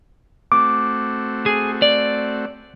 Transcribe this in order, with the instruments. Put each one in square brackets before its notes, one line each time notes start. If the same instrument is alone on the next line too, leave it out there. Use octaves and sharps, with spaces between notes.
[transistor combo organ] A3 C4 F#4 [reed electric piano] D6
[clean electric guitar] G#4
D5